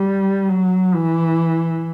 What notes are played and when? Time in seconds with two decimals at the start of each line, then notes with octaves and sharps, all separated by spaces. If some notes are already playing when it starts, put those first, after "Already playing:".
Already playing: G3
0.49 F#3
0.94 E3